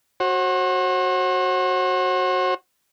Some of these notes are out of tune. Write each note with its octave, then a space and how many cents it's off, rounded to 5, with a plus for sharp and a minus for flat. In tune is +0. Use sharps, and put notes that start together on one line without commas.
F#4 +0 C5 +45